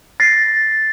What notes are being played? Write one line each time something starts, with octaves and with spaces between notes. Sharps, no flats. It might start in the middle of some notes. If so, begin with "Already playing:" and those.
A6 A#6 C7